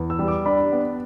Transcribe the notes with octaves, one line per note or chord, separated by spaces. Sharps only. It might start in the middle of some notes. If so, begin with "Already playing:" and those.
Already playing: E2
E6
G3
D6
D4 B5
B3